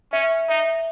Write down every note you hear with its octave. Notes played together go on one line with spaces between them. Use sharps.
C#4 E5
D#4 E5